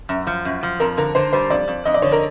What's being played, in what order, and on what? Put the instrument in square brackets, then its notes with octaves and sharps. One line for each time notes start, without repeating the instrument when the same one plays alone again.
[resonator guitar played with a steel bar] F#2
F3
F#2
F3
[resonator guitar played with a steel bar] F2 [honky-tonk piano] A#4
[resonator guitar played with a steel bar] D3 [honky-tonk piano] A#4
[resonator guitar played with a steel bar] D3 [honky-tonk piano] C5
[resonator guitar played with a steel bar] G3 [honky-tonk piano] C5
[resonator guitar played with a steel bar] F2 [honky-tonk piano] D5
[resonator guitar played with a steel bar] F2
[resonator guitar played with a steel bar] F2 [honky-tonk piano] D#5
[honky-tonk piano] D5
[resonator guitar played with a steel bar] D3 [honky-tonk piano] C#5
[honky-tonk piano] A#4